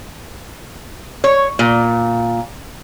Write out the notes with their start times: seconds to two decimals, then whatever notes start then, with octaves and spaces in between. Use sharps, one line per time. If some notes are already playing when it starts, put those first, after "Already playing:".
1.24 C#5
1.59 A#2